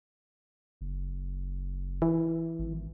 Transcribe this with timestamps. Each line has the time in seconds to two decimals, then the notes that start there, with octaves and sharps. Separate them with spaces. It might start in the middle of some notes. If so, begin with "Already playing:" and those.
0.81 F#1
2.02 E3
2.59 G#1